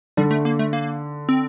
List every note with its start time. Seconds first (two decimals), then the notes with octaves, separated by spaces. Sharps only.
0.17 D3 G3
0.31 A3
0.45 A#3
0.59 A3
0.73 A#3
1.29 C4